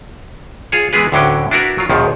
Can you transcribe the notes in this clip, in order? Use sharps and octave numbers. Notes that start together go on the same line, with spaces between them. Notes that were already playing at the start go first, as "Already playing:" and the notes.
F4 G#4 C#5
E3 G#3 B3 G#4 B4
D2 A2 D3 F#3 C#4 G5
D4 E4 F#4 A#4 B4
F#3 F4
A#1 D#2 B2 D#3 F3